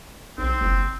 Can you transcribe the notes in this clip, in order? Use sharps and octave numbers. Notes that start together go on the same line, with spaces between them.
B1 C4
F#1